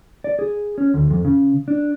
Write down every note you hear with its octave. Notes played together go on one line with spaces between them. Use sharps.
D5
G#4
C#4
D2
F2
C#3
D4